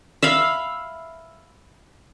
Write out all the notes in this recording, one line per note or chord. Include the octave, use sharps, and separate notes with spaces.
E5 F5 B5